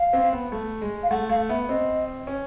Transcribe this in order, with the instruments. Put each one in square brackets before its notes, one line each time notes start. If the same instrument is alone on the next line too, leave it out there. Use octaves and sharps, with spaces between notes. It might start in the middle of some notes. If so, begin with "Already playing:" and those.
Already playing: [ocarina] F5
[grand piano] C4
B3
A3
G#3
[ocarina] F5
[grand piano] A3 [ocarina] F#5
[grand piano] A3 [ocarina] F5
[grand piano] B3 [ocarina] E5
[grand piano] C4 [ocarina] D#5
[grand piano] C#4